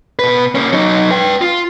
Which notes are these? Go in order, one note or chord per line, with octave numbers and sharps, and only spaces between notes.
B2 B4
A#3 C#4
F#3 D#4
B4 G5
F4